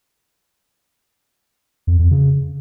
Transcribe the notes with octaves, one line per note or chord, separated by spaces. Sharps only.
F2
F2
C#3